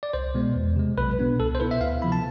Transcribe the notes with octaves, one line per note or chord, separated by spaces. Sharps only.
D5
C2 C5
B2 G#3 B3
E2
C3 G#3
B1 B4
B2 B3 D4
C2 A4
C5
B2 B3 E4 B4
E5
D2 F5
C3 F3 B3 B5
A5